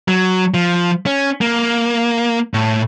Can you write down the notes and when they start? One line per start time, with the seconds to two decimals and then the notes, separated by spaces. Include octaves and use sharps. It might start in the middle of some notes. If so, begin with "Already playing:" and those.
0.08 F#3
0.54 F3
1.06 C#4
1.41 A#3
2.54 A2